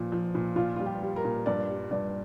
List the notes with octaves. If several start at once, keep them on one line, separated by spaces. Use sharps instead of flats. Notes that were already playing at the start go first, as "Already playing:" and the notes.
Already playing: A#2 F3
F3
A#2
A#2 F4
G3 F4
G4
G3
A#4
A#2
G2 D5
G3
G2 D5